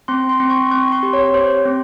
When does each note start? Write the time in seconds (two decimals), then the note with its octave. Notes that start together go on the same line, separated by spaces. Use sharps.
0.08 C4 C6
0.29 C6
0.40 C4
0.50 C#6
0.71 C4 C#6
0.92 C6
1.03 G4
1.13 C#5
1.34 G4 C5
1.65 C4